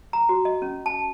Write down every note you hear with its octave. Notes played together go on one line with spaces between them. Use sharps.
A#5
F#4
D#5
C#4
A5